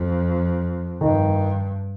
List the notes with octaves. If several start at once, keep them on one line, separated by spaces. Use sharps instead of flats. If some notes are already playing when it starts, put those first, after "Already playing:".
Already playing: F2
G2 D#3